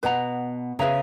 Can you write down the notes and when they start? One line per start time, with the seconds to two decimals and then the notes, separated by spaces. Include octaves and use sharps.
0.03 B2 B4 F#5 A#5
0.79 C#3 G#4 B4 E5 A#5